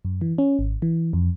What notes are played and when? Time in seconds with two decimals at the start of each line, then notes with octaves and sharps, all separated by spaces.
0.05 F#2
0.21 E3
0.38 C#4
0.59 G#1
0.82 E3
1.13 F2